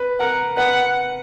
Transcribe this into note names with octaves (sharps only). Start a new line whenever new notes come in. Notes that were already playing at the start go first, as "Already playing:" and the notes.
Already playing: B4
A#4 F#5
B4 F#5